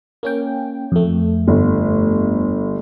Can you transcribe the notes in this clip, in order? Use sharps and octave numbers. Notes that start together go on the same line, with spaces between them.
A#3 C#4 G5
F2 A3
G1